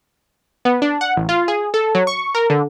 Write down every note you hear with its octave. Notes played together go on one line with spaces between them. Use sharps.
B3
D4
F#5
A1
F4
G#4
A4
F#3
C#6
A#4
D3